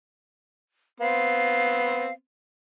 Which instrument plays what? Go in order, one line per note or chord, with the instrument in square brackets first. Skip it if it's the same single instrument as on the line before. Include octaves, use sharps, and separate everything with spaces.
[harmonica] B3 C4 [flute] F5